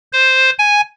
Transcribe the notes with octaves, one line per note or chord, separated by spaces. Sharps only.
C5
G#5